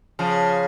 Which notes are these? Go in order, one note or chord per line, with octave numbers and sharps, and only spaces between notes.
C#3 F3